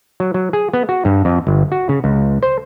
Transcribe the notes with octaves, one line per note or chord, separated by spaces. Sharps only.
F#3
F#3
G#4
B3
F#4
G2
F2
G1
F#4
C#3
C#2
C5